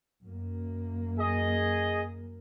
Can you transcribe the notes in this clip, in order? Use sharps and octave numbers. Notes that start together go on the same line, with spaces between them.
F#2 A#3
G#4 D#5